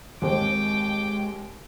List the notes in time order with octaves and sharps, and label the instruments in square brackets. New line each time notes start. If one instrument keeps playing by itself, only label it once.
[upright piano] D#2 C4 [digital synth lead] G#3 [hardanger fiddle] G5 D6